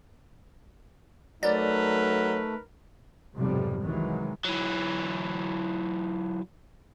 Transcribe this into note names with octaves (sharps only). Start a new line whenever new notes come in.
F#3 A3 D#4 A#4 B4 D5
B1 F2 G#2 C3 F3 G3
C2 D#3 E3 F#3 G#3
E3 F#3